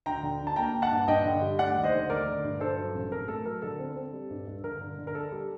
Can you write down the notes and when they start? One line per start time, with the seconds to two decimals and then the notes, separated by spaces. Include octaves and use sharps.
0.06 D2 G5 A#5
0.23 D3
0.40 D2
0.47 A5
0.56 A#3 G5 A#5
0.74 A#3
0.82 F#5 A5
0.91 G2
1.07 G2 D#5 G5
1.25 D3
1.41 G3
1.59 A3 D5 F#5
1.76 D#2
1.84 C5 D#5
1.92 D3
2.10 A3 A#4 D5
2.26 D3
2.44 G2
2.60 G2 A4 C5
2.77 F#3
2.94 A1
3.11 C3 A#4
3.28 A3 A4
3.45 F#3 A#4
3.62 D3 A4
3.79 C4
3.96 C4
4.13 G3
4.30 G2
4.47 G2
4.64 D3 A#4
4.81 D3
4.98 D3
5.07 A#4
5.15 D4 A4
5.32 G3